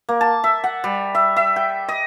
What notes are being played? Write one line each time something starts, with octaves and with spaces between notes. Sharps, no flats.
A#3
A5
E5
F#5
G3
E5
E5
G5
D#5